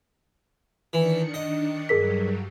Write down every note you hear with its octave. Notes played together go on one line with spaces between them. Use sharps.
D#3 E3 D4 C#7
D#5
G2 F#3 G3 G#4 A#4 B6